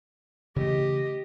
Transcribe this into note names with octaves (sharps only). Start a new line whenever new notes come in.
C#3 E3 A3 G4 D#5